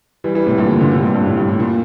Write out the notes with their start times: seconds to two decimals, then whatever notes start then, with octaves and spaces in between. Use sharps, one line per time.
0.24 E3 G3
0.35 E3 G3
0.46 A2 C3
0.58 G2 A#2
0.69 A#2 D3
0.81 A#2 D3
0.92 A2 C3
1.03 G2 A#2
1.14 G2
1.26 A2
1.38 G2
1.48 A2
1.60 A#2